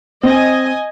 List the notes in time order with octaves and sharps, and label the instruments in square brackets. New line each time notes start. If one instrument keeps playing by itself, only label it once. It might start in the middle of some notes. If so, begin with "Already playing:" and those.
[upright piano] C4 [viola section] D#5 G#5